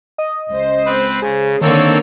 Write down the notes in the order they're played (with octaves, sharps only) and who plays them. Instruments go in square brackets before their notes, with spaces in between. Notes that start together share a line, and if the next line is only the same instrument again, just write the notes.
[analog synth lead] D#5
[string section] C#2 C5
[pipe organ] C4 B4
[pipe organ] C#3 [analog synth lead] G#4
[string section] D3 A#3 C#5 [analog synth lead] D#3 [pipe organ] C4 A4